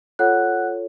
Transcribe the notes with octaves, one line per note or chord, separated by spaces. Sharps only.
F4 A4 C#5 F#5 F#6